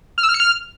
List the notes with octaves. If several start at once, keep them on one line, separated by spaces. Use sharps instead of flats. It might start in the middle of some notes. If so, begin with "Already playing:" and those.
F6
E6
F6
C#7
F6